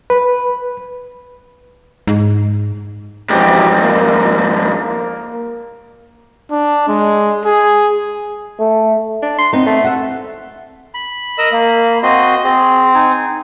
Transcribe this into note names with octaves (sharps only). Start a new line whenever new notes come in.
B4
G#2
F2 G#2 E3 F#3 G4
A#3
A#3
D4
G#3
G#4
A3
D4
C6
B3 C4 D#4
A3
E5 F#5
B5
A#4 D#5 E6
A#3
C4 F#4 D#5 C6
C4 G#4
D#4 G#5